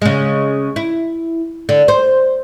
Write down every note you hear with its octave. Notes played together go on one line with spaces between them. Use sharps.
C#3 G#3
E4
D3
C5